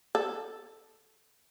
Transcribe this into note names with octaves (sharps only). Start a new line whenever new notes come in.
A4